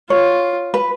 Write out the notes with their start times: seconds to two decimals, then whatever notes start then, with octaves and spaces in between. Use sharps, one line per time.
0.10 F4 C#5
0.74 B4